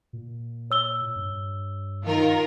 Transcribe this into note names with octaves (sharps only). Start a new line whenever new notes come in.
A#2
C#5 E6 G7
G2
D#3 F4 A#4